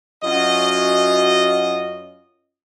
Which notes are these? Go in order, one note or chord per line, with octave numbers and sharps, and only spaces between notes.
F#2 C#4 F4 F#4 D#5